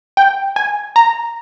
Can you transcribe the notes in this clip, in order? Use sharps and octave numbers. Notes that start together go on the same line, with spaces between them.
G5
G#5
A#5